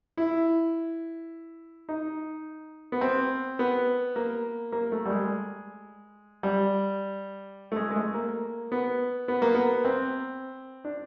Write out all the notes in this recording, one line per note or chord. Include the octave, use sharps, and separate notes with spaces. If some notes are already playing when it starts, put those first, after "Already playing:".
E4
D#4
B3
C4
B3
A#3
A#3
A3
G3
G#3
G3
A3
G#3
G#3
A3
A#3
B3
B3
A#3
B3
C4
D4